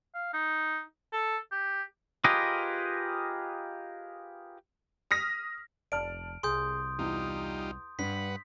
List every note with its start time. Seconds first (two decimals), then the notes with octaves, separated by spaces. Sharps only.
0.15 F5
0.34 D#4
1.13 A4
1.52 G4
2.24 F4 G4 G#4 A#4 B4 D#5
5.11 D#6 F6 A#6 B6
5.92 F1 D5 A5 F6 D7
6.43 C2 G#4 C6 D#6 G6
6.99 E2 G3 D#4 F4
7.99 G2 D4 B4 F#5 B6